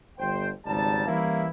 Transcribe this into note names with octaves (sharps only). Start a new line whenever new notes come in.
G1 C5 G5
G#1 C#2 G3 D#4 A5
E3 G3 A#3 C#4 E4